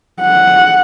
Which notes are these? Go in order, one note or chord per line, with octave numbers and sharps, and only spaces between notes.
F#5